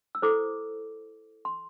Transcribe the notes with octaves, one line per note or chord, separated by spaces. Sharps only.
E6
E4 A4 C5 D6
C6